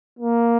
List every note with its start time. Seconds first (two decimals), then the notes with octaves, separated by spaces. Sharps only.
0.19 A#3